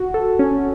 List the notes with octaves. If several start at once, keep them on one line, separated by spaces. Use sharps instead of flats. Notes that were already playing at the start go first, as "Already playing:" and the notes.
Already playing: F#4
A4
C#4